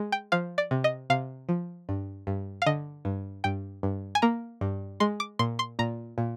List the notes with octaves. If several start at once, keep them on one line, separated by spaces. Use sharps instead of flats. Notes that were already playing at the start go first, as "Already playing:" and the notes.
Already playing: G#3
G5
F3 F5
D5
C3
D#5
C3 F5
F3
G2
G2
F5
D3 D#5
G2
G2 G5
G2
G#5
A#3 A#5
G2
G#3 C6
D6
A#2 C6
C6
A#2 A#5
A#2